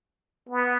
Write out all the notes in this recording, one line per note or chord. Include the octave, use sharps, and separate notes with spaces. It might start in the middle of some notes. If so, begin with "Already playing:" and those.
B3